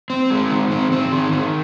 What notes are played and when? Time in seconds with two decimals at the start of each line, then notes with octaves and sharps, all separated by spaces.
0.10 C4
0.30 G#3
0.51 D#3
0.71 C4
0.92 C4
1.12 D#3
1.33 D#3